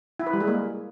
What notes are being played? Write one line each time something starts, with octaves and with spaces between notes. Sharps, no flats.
E4
B4
G3
G#3
A#3